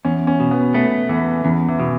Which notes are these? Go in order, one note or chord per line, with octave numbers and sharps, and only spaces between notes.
E2 C#4
C#4
B2
B3
A3 B3
E2 E3
E2 C#3
E3
B2